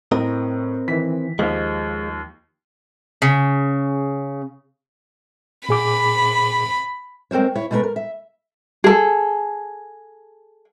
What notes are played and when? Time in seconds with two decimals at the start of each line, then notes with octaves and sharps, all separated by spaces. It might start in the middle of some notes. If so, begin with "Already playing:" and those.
0.12 A2 C4 A#4 D#5
0.88 D#3 E3 B6
1.39 D#2 F3 G#3 D#5 F5
3.22 C#3
5.69 A#2 G#4 B5 D6
7.31 G#3 C4 A#4 C5 C#5
7.56 E4 C#5
7.71 B2 G#3 A3 B3 A#4 B4
7.83 A#4
7.96 E5
8.84 G#4 A4